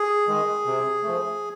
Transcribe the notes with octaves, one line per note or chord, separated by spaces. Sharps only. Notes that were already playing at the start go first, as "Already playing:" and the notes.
Already playing: G#4
D#3 G#3
C3
F3 A3